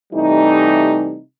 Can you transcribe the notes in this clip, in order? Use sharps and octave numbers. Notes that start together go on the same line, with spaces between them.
C3 E3 G3 A3 D#4